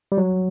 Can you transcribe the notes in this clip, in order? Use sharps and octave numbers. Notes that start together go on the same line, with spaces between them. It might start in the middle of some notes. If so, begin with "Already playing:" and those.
G3
F#3